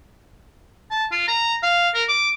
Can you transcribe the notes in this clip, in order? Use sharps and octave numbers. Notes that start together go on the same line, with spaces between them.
A5
F4
A#5
F5
A#4
D6